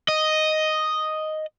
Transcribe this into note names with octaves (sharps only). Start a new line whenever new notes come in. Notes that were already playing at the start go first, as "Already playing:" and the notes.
D#5